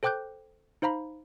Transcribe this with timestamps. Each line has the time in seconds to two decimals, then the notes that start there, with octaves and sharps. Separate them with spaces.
0.03 A4 C5 G5 D6 F#6 G6
0.82 D#4 C5 F5 A#5 B5